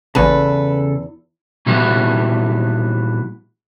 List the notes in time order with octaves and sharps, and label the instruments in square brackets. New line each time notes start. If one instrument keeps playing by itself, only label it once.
[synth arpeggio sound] A1 A#3 G#5 [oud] E2 [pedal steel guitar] C#3 A4 [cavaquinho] B4
[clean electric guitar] A#2 E3 G3 B3 E4 F#4